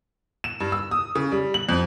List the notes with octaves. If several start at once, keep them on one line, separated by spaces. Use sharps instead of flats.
E7
G2
E6
D#6
C#3
G3
F#7
F2